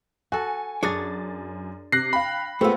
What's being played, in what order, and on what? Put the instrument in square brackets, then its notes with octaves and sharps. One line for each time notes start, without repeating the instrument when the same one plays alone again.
[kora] F#4 A4 [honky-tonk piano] G#5
[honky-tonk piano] F#2 A6 [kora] D4 [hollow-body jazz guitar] G#4 C#5
[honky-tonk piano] C3 [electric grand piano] F#6 A#6 C7
[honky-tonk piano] F5 G5 [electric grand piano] B5
[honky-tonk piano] G#3 F4 [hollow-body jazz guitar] A3 B3 [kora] C4